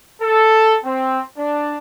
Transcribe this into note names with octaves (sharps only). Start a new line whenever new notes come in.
A4
C4
D4